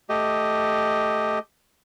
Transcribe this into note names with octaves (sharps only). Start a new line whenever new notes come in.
A3 G4 D#5